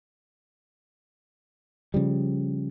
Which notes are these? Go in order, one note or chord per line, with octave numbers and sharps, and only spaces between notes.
C#3 F3 G3